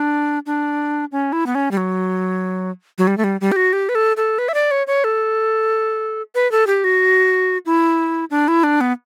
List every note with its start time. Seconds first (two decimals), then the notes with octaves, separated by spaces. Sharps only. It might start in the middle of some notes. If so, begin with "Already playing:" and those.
Already playing: D4
0.46 D4
1.12 C#4
1.33 E4
1.46 B3
1.55 C#4
1.71 G3
1.77 F#3
2.98 F#3
3.07 G3
3.18 A3
3.24 G3
3.41 G3
3.52 G4
3.56 F#4
3.73 G4
3.89 B4
3.95 A4
4.17 A4
4.38 B4
4.49 E5
4.54 D5
4.71 C#5
4.87 C#5
5.04 A4
6.35 B4
6.52 A4
6.67 G4
6.84 F#4
7.66 E4
8.30 D4
8.48 E4
8.64 D4
8.81 B3